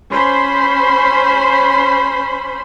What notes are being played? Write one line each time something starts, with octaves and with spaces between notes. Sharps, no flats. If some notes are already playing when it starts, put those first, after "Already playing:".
C#4 C5 B5 C6